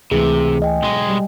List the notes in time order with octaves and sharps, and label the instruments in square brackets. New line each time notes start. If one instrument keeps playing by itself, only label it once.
[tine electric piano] C#2 E3 A3 [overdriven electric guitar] C3 [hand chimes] G#4
[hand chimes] D#5 G5 G#5
[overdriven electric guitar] B1 G#3
[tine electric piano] G3